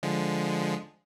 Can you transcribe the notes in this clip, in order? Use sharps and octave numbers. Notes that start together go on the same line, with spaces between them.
D3 F3 G#3